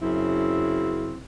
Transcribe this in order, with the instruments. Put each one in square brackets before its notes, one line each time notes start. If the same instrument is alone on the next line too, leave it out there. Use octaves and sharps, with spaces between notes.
[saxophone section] F#2 C#3 C4 E4